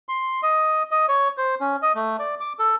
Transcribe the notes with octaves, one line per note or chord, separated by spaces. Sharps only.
C6
D#5
D#5
C#5
C5
C#4
D#5
A3
D5
D6
A4